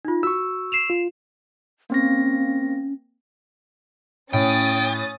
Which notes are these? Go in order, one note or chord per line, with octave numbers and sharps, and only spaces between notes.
D#4 F4
F#4 C#6 E6
C7 E7 F7
F4
A#3 C4 C#4 A#6
A2 C#4 G5 D#6 A6